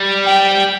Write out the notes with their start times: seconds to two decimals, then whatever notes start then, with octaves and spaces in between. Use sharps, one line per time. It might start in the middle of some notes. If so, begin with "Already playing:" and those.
Already playing: G3
0.24 G5